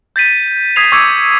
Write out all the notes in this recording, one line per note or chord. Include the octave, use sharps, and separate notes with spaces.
G6 A6 B6 D#7
D#6 G#6 B6 C7 E7 F7
C#6 D6 E6 G#6 C#7